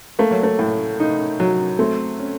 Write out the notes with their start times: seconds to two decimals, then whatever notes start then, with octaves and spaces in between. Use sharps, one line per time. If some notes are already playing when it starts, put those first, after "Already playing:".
0.19 A3 A#3
0.31 F#3
0.43 A3
0.59 A2
1.00 D#4
1.40 F#3
1.79 A3 C4
2.19 C#4